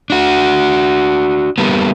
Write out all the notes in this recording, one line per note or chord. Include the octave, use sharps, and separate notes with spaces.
D4 F#4
G3 A#3 B3